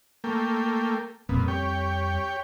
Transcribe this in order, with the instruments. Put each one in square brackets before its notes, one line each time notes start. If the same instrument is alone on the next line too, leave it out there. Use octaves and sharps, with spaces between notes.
[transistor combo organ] A3 A#3 G5
[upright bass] F2 G3 [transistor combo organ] A#2 B3
[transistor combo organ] G4 C#5 G5